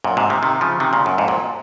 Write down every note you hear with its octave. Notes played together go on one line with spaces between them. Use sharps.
F#2 A#2
G#2 C3
C3 D#3
C3 D#3
C#3 F3
C3 D#3
A#2 C#3
F#2
F2 G#2
F#2 A#2